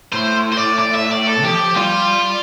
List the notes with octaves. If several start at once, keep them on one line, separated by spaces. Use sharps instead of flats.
A2 C5
C5
D5
D5
E5
D5
A4
F3 G4
G3 F4